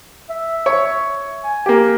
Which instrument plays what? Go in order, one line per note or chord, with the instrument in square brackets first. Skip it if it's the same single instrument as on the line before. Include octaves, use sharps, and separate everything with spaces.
[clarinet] E5
[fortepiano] C#5
[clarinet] G#5
[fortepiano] A#3 G4